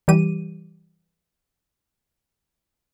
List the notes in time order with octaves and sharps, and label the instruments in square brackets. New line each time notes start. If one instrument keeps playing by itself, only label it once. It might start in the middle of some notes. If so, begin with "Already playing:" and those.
[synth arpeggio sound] E3 G3 G4 D#7